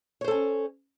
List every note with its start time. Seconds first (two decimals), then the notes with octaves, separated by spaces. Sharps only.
0.21 C#5
0.24 C5
0.28 A4
0.31 C#4